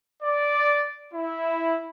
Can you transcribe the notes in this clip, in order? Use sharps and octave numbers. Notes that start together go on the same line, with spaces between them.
D5
E4